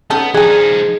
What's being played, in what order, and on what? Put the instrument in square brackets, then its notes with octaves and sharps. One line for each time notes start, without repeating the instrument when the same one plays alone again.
[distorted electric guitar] B3 [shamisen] C#4 D#4 A4
[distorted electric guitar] F3 D#4 [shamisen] D4 G#5 [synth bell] G#4